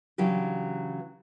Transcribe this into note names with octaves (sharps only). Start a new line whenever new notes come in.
C#3 E3 F#3 D4 G4